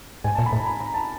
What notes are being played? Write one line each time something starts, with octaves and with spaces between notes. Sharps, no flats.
G#2 G#5
A#2 A5
B5
A2
A#5
B5
A#5
A5